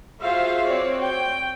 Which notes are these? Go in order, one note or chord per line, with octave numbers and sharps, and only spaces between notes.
F4 F#4 G#4 C5 E5 F5
C4 F#4 C#5 D5
G5